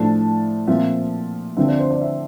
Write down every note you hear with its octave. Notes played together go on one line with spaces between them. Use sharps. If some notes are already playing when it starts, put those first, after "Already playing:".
Already playing: A2 F3 A3 D4 A5
A#2 F3 C4 E5
D3 F3 C4 E5
D5
C5
D5
E5